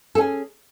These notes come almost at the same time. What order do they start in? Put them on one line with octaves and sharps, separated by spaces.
A4 C#4 G#4